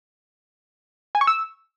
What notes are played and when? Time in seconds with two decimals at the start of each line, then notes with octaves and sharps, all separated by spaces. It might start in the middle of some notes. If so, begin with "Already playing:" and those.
1.15 G#5
1.21 C#6
1.27 E6